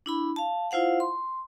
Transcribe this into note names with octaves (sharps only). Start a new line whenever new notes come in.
D4 E4 B5
F5 A5
E4 F4 C5 F5 F#5
C6